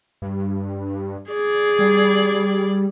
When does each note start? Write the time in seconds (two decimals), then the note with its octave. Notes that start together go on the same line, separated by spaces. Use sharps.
0.22 G2
1.31 G#4 D5
1.79 G3